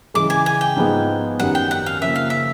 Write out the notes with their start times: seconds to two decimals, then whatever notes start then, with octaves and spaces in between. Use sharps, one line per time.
0.14 C#3 E3 G#3 D6
0.30 G#5
0.46 G#5
0.61 G5
0.76 G#2 F3 G#3 B3 D#4
1.39 F#2 D#3 G3 F#5
1.55 G5
1.71 F#5
1.86 F5
2.02 C#3 F3 A#3 E5
2.16 F5
2.30 E5